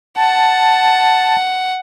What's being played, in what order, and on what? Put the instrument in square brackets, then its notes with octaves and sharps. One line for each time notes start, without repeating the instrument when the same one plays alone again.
[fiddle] F#5 [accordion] A5